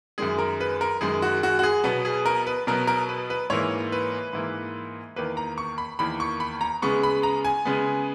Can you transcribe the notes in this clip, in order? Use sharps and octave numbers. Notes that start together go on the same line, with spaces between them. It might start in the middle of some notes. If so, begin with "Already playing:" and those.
F#2 D#3 G#3 G#4
A#4
B4
A#4
F#2 D#3 G#3 G#4
F#4
F#4
F#4
G#4
B2 F#3 B3
G#4
A#4
B4
B2 F#3 B3 A#4
A#4
B4
B4
G#2 E3 A#3 C#5
B4
G#2 E3 A#3
E2 D#3 A#3 B4
A#5
C#6
B5
E2 D#3 A#3 B5
C#6
B5
A#5
C#3 G#3 B3 C#6
B5
A#5
G#5
C#3 G#3 B3